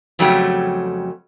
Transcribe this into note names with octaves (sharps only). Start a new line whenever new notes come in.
F2 C#3 F#3 G3 A3 G5